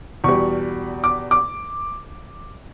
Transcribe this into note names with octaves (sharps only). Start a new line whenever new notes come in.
E2 B2 G3 C#6
D6
D6